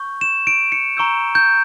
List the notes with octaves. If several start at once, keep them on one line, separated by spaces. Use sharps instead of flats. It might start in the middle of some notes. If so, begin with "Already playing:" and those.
Already playing: C#6 G6
E7
D7
C#7
A#5 C#6 E6 G6
G6